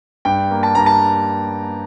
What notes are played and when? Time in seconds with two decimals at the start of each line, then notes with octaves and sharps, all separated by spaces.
0.25 G2 G5
0.51 A#3
0.63 A5
0.75 G2 A#5
0.86 A5